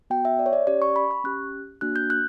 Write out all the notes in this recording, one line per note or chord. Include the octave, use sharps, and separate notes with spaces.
B3 F#4 G5
E5
D5
C#5
D5
C#4 G4 D5
C#6
B5
C#6
C#4 G4 F#6
A#3 D4 F#4 F#6
G6
F#6